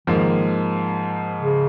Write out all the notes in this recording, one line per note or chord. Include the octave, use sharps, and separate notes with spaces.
G#2 D#3 F3 A#3
C#3